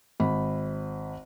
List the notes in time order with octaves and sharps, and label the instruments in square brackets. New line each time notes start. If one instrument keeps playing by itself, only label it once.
[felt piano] G#1 B5